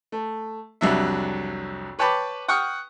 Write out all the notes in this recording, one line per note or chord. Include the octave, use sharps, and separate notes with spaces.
A3
C2 F2 F#3 D4 E5
B4 C#5 G5 A5 B5 D6
F#5 G5 C#6 D#6 F6